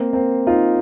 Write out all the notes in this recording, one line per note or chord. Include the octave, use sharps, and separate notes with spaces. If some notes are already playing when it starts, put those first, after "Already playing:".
Already playing: A#3 C4
A#3 C4
D#4 F4